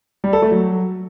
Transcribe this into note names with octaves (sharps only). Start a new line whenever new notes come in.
G3
A4
A3
F#3